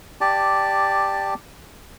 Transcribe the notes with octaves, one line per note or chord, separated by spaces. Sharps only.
G4 D5 A5